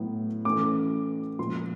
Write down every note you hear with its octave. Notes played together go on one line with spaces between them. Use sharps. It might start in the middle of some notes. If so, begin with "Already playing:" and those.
Already playing: A2 F#3 B3
E3 A3 C#4 D6
A#2 F3 G#3 C6